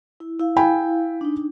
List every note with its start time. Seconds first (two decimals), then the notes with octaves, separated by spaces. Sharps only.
0.20 E4
0.39 E4 F5
0.57 G5 G#5 B5
1.21 D4 D#4